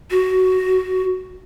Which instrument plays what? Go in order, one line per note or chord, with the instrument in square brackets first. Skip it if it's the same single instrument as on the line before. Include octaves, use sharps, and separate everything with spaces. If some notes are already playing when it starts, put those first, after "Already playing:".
[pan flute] F#4